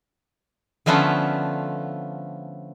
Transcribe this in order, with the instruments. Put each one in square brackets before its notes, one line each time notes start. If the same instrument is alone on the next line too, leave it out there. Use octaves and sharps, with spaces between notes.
[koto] D3 F3 A3 B3 C#4 F4